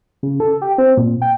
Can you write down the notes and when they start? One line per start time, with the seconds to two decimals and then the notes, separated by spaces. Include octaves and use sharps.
0.23 C#3
0.40 A4
0.62 G4
0.78 C4
0.97 A#2
1.22 G5